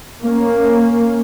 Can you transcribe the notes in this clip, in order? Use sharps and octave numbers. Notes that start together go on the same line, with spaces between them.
A#3 C#4